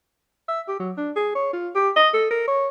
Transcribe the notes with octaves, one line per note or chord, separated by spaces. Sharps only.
E5
G4
F#3
D4
G#4
C#5
F4
G4
D#5
A4
A#4
C#5